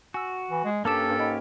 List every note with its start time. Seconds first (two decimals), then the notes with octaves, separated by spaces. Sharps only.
0.14 F#4 G#5 E6
0.50 E3
0.64 G#3
0.85 G2 A#3 C#4 G4 A4 A5 D6 E7
1.06 G2
1.19 G#2 D#5 G5 B5